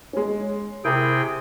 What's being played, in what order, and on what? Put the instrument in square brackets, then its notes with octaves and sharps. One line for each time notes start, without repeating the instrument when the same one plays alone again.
[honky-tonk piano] G#3 C#4
[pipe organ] C3 G#4 G5 [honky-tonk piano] E4 A#4